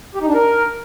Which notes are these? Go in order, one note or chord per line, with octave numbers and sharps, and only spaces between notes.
G4
D#4
D4
A#4